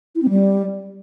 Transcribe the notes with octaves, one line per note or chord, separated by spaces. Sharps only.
E4
C4
G3